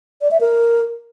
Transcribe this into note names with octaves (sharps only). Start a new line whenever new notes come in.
D5
E5
A#4